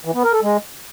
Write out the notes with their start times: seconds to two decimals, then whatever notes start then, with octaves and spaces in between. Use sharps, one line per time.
0.05 E3
0.14 B3
0.24 A#4
0.33 A4
0.42 G#3